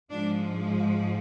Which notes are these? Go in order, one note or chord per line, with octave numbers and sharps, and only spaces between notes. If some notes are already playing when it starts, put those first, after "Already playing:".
G#2 F3 G#3 D4